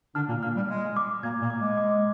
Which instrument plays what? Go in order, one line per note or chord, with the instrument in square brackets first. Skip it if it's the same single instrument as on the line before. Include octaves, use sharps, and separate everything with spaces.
[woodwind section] D3 D4 [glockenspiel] F6
[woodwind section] A#2 A#3
[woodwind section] A#2 A#3 [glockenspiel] F6
[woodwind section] G3
[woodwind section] G#3 [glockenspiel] F6
[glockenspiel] D6
[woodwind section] A#2 A#3 [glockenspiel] G#6
[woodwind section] A#2 A#3
[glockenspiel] D6
[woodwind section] G#3
[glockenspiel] D6